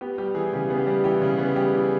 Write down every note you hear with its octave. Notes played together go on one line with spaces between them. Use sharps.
B3 G4
G3 G4
E3 G#4
C#3 G4
B3
G4
G3
E3 G4
C#3
B3
G3 G4
E3
G#4